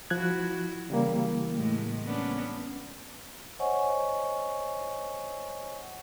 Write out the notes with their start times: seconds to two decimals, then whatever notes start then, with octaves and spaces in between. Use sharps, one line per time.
0.10 F3 E4 F#4 F#6 G#6
0.90 C#3 E3 G3 A#3
1.55 A2 G#3 A3
2.05 B3 C#4 D4
3.59 C5 C#5 D#5 F#5 G#5 C#6